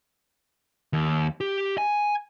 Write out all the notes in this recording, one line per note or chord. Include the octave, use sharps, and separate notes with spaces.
D#2
G4
G#5